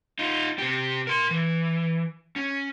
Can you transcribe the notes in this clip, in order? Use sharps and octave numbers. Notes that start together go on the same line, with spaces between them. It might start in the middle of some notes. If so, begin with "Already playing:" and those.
D#4 F4
C3 G4
A#4 C6
E3
C#4